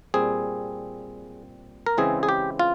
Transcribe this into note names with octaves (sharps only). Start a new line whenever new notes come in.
A#2 G3 C4 G#4
A#4
C#3 E3 G#3 C4 E4 G#4
G#4
G4
F4